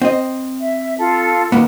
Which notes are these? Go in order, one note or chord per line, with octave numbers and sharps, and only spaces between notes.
C4 D#5
E5
F4 A4
D#2 A#3 B3